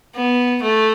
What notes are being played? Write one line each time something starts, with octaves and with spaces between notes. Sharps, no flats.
B3
A3